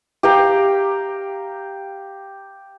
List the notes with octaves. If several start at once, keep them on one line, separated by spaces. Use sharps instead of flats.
G4 F5 G5 A#5